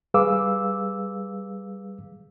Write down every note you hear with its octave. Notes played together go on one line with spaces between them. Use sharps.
G3 G#4 B4 F5 D6 E6